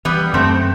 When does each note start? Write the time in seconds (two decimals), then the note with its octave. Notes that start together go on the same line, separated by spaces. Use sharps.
0.05 E3 G3 B3
0.33 F#2 A3 C4